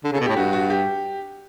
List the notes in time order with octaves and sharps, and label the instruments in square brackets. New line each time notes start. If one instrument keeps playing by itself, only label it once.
[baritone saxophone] D3
C#3
[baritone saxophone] B2 [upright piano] A4
[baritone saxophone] A2 [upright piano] G4
[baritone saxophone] G2 [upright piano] F#4
[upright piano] F#4
G4